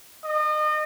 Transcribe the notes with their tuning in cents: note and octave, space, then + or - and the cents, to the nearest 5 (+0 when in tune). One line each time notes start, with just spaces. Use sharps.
D#5 -35